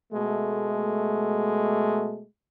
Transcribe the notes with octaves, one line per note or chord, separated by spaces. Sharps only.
B2 G#3 A3